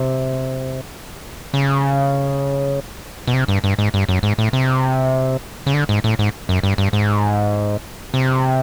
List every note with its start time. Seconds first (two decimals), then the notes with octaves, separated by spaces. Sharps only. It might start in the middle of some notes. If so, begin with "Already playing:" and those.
Already playing: C3
1.54 C#3
3.27 B2
3.34 C3
3.48 G2
3.64 G2
3.79 G#2
3.94 G2
4.09 F#2
4.23 G#2
4.38 A2
4.53 C3
5.66 C#3
5.74 D3
5.89 G#2
6.04 A2
6.19 G#2
6.49 F#2
6.63 G2
6.78 G2
6.93 G#2
8.14 C3